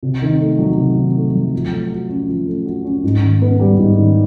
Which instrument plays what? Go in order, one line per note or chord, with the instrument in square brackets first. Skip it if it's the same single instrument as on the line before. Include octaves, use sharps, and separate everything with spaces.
[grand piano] C3
D#3
A3
F#3
C3
D#3
A3
F#3
F3
A3
F#4
C#4
F3
A3
F#4
C#4
G#2
D#3
B3
G3
G#2
D#3